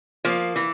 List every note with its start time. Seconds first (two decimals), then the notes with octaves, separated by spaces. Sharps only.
0.25 F3 A#3
0.56 E3